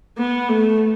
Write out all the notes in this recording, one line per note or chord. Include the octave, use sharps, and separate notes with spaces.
B3
A3